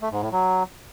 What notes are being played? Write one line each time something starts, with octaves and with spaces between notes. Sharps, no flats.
A3
G#2
A2
F#3